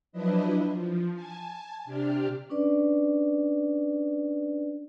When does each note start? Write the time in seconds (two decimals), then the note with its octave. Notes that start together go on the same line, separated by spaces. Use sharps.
0.12 F3 F#3 D4 E4 B4 D#5
0.70 F3
1.13 G#5 A5
1.84 C3 D4 G4 F6
2.50 C#4 D4 B4 D5